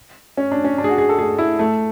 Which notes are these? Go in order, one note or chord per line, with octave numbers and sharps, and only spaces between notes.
C#4
D4
C#4
D4
G#4
F#4
G#4
A4
G#4
E4
A3